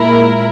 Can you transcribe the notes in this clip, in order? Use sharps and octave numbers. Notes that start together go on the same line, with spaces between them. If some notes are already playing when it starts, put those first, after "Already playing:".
Already playing: A#2 G#3 E4 A#4